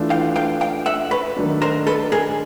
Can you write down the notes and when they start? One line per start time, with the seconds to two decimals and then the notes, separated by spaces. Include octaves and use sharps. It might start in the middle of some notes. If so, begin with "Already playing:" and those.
Already playing: E3 A3 D4 F4
0.10 F5 G5
0.36 F5 G5
0.61 F5 G5
0.86 E5 F#5
1.11 B4 C#5
1.36 D#3 F#3 A3 D4
1.62 A#4 C5
1.87 A4 B4
2.12 G#4 A#4